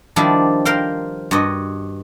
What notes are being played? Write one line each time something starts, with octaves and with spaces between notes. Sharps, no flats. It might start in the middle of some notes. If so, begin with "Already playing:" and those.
D#3 F3 G3 D4 E4
A#4 C5 F5 G5
G2 F#4 D#5